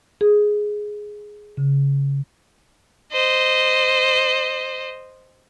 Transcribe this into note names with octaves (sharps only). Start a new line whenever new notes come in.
G#4
C#3
C5 D#5